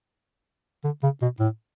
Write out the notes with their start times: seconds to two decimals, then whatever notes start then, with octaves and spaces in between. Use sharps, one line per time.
0.84 D3
1.03 C#3
1.22 B2
1.39 A2